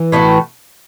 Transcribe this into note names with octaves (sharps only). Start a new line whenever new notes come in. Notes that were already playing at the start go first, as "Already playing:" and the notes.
Already playing: E3
A2 A3 D4 F#4